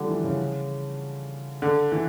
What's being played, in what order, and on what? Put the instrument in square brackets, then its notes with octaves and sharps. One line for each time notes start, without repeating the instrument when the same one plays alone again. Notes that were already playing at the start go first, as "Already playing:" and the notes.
Already playing: [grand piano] D3 F3 G3
E3
C#3
D3
E3